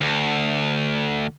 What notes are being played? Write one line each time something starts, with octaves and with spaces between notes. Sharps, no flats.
D2